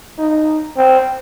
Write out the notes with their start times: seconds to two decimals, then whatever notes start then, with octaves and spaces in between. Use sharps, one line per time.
0.19 D#4
0.77 C4